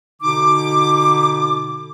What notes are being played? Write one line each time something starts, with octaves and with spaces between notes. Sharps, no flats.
B2 D3 D#4 D6